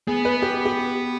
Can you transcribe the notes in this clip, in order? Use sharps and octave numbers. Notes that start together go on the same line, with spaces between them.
B3 G#4
B4
G4
G4